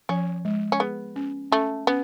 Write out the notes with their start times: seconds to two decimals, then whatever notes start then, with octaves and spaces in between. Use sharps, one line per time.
0.09 F3 C#4
0.45 G#3
0.72 C#4
0.80 B3 G#4
1.16 C#4
1.52 A3 C#4
1.87 B3 C#4